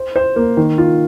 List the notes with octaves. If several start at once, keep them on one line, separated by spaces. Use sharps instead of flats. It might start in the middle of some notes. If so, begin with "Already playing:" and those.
Already playing: C5
C5
A#3
D#3
F4